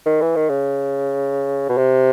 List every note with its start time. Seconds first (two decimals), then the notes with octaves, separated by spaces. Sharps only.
0.06 D#3
0.21 E3
0.36 D#3
0.49 C#3
1.69 B2
1.78 C3